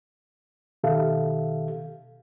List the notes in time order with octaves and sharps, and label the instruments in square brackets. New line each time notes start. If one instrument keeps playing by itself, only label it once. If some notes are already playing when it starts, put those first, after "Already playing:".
[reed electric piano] B2 D#3 G4 A4 E5 F5